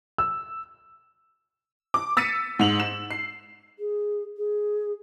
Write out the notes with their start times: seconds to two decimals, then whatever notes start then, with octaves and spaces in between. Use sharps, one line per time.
0.18 E6
1.94 D6
2.17 E6 A6 B6 C#7 D#7
2.59 G#2 F7 F#7
2.80 E7
3.11 C7
3.79 G#4
4.37 G#4